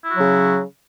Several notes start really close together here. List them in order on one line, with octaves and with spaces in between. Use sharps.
E4 F#4 F#3 C#3